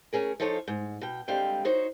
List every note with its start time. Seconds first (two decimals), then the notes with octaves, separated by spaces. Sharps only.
0.13 A3 C#4 G#4 A#4
0.40 F3 D#4 F4 A4 C#5
0.68 G#2
1.01 B2 G5
1.28 D3 G3 G#3 C4 F5 G5
1.65 D#4 F#4 C5 C#5